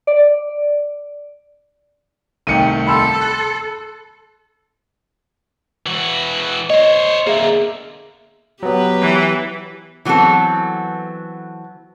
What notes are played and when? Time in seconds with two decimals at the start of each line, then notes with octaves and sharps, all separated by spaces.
0.07 D5
2.47 C2 D#3 A3 G5 C#7 D#7
2.87 A4 B5 C6 E6
3.21 F#6
5.86 E3 F#4
6.70 C5 C#5 D#5
7.27 D3 A#3 G#4 E5
8.63 F#3 B3 G4 B4
9.02 E3
10.05 E3 F#3 B3 C4 A4